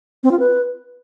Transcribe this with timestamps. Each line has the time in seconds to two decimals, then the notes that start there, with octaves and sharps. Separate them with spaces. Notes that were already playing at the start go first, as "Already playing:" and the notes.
0.24 C4
0.31 F4
0.39 B4